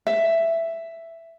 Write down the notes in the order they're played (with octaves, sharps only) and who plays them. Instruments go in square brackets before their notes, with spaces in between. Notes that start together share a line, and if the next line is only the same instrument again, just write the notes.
[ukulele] E5